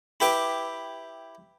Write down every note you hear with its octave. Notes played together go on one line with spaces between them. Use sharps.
E4 G4 B4 D6